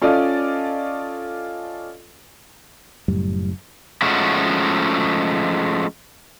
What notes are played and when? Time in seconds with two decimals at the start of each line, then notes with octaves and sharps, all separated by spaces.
0.02 C#4 F4 A4 D5 D#5
3.08 F#1 F#2 A2 G3
4.02 F3 G#3 A3 C#4 F#4